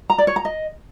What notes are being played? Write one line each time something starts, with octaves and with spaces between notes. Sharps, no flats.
A#5
D5
C#5
A#5
D#5